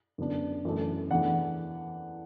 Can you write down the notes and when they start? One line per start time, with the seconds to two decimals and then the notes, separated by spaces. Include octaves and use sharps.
0.18 F#2 D3 B3 D4
0.65 F#2 E3 A3
1.11 E2 E3 A3 D4 F#5